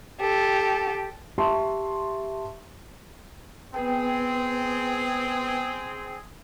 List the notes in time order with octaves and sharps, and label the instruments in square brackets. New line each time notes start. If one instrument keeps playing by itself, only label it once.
[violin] G4 A4
[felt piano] G4 E5 A5 C6 C#6
[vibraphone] B3 B4 G5 [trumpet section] C4 G#4